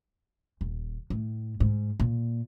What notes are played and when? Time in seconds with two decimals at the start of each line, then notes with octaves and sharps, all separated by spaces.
0.61 D#1
1.10 A2
1.60 G#2
2.00 A#2